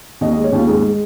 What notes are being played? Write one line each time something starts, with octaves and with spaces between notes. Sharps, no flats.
D#2 D#5
D#5
G#3
C#5
D#2 F4
G#2 G#4
G#3